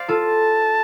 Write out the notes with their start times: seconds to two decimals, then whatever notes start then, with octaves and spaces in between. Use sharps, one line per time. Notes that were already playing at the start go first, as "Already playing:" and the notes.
Already playing: C5 D5 F5
0.08 F4 A4 A5